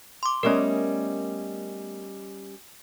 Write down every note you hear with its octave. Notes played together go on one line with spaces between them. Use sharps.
C6 D6
G3 A3 B3 C#4 A#4 D#5